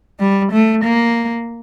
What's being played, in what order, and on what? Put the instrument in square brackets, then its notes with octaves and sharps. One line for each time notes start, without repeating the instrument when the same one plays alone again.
[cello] G3
A3
A#3